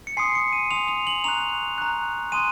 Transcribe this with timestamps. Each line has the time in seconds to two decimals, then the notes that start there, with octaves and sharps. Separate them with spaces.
0.07 C#7
0.17 G#5 C6 D#6 C7
0.35 C#7
0.53 D#7
0.71 G#5 C6 D#6 F7
0.88 F7
1.07 F#7
1.24 A#5 C#6 F#6 F7
1.78 A#5 C#6 F#6
2.32 G#5 C6 D#6 F#6 D#7